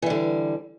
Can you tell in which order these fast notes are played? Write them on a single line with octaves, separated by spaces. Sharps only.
E3 G3 D3